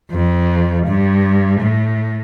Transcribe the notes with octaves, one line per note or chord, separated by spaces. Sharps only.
F2
G2
A2